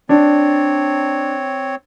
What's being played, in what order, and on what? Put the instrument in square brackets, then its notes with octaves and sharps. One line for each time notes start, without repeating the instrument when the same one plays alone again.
[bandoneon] C4 C#5 [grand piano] D4